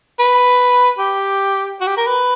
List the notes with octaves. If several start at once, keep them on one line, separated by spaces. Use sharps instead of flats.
B4
G4
F#4
G4
A#4
B4